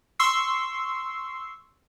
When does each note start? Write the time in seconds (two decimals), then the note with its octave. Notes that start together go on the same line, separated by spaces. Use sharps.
0.19 C6 C#6 E6 C7